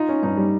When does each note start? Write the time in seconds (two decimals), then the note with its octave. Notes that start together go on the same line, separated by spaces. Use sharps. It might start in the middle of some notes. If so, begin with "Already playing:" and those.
Already playing: D#4 F4
0.09 C#4
0.23 G2 D#4
0.37 G3